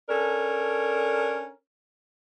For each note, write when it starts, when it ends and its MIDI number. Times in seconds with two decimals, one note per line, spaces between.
0.09 1.50 61
0.09 1.50 62
0.09 1.50 69
0.09 1.50 70